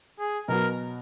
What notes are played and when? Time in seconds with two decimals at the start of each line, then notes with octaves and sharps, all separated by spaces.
0.20 G#4
0.48 B2 F#3 B3 F#4 A#4